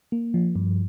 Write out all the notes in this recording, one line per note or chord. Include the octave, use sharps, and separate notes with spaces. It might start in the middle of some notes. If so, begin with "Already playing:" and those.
A#3
F3
G2